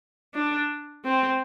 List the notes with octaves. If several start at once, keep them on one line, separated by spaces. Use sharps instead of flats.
D4
C4